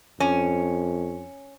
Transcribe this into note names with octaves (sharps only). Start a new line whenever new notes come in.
F2 C#4